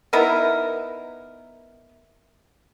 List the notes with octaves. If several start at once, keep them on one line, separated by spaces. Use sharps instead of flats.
B3 D#4 E4 A#4